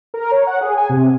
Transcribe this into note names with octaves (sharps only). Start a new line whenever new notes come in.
A#4
C#5
F#5
G#4
G#5
C3